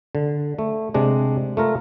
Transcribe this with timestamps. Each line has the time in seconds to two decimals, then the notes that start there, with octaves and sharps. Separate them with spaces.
0.15 D3
0.59 A3
0.94 C3 G#3 D4
1.57 A3 F4 A#4